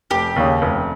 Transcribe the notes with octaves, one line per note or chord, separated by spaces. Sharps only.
F1 G4
D#2 C#3
F1